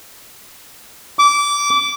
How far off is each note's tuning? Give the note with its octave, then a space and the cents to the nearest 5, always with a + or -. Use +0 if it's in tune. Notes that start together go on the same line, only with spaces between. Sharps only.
D6 -20